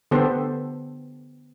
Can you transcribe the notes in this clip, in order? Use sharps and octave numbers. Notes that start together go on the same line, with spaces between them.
D3 B3 G4 A4 C5